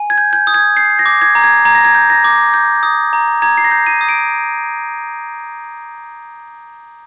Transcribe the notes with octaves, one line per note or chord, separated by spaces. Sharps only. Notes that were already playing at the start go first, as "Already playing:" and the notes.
Already playing: G#5
G#6
G6
G6
D#6
G#6
G6 C7
A#6
D6
G#6
A#5
G#6
A#5 G#6
A#6
G#6
G6
A#6
D6
G6
D#6
A#5
A#5 G#6
C7
A#6
G6
D#7
D#6
D7